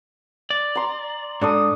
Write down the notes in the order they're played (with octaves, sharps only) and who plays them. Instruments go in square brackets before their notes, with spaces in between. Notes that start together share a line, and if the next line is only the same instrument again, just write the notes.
[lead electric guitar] D5
[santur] A#5 C6
[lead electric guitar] G#2 [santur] D4 A4 D#6